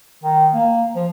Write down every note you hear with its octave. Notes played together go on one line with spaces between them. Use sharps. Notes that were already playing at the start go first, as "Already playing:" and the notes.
D#3
A#3
F3